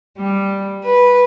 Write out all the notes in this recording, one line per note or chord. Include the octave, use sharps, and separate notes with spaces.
G3
B4